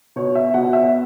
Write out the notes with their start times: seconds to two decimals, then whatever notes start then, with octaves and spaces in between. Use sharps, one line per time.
0.16 B2 C#5
0.35 E5
0.54 B2 F#5
0.73 E5